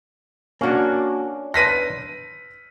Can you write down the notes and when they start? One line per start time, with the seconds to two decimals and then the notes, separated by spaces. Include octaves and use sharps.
0.61 A#3 C#4 D4 F#4
1.54 B4 A5 C6 A#6 B6 D#7